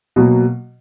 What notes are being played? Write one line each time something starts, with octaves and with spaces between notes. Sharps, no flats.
B2 F#3 A#3